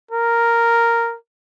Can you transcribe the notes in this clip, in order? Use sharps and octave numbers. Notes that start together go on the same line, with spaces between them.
A#4